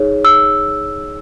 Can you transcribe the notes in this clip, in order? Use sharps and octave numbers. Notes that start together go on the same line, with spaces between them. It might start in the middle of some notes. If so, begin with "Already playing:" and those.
Already playing: D#4 G#4 C#5
E6